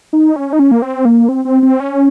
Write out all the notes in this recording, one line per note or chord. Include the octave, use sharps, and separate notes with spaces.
D#4
C#4
D#4
C#4
A#3
C4
A#3
C4
C4
C4
C#4